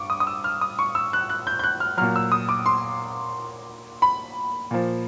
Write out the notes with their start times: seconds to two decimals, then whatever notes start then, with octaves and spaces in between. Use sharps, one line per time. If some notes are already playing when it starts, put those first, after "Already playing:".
Already playing: G2 C#6 D6
0.10 D#6
0.20 D#6
0.27 E6
0.44 F6
0.61 D#6
0.79 C#6
0.95 E6
1.13 F#6
1.30 F#6
1.47 G6
1.59 G6
1.64 F#6
1.80 F6
1.97 A#2 F#3 F6
2.16 E6
2.32 D#6
2.49 D6
2.66 C6
4.02 B5
4.71 A#2 F3